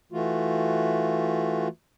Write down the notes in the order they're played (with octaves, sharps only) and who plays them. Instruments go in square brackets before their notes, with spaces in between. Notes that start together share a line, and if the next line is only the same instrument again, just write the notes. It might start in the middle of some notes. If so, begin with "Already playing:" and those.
[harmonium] E3 A3 F4 F#4